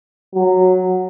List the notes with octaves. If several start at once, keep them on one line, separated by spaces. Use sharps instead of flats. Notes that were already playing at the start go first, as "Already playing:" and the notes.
F#3